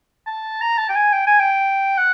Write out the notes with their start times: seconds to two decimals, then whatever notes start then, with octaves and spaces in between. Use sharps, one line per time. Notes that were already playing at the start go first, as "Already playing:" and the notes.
0.26 A5
0.61 A#5
0.78 A5
0.89 G5
0.95 G#5
1.13 G5
1.27 G#5
1.39 G5
1.98 F#5